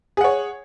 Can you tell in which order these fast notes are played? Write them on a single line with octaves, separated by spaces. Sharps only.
G#4 F#5 C#5